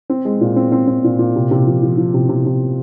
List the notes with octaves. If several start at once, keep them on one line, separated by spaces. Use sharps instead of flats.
C4
G#3
A#2
C4
C4
C4
A#2
A#2
C3
C3
F3
F3
F3
C3
C3
C3